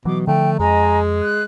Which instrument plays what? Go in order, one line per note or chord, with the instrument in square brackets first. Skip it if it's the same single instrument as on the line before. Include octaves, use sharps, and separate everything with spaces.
[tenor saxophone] B2 [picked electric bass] E3 F#3 [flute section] D6
[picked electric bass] D3 F3 [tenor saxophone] A3 [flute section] G5
[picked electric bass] F2 [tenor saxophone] G#3 [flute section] D#5 G#5 A#5
[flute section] F#6